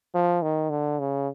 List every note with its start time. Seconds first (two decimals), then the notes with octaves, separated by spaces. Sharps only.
0.14 F3
0.42 D#3
0.70 D3
0.99 C#3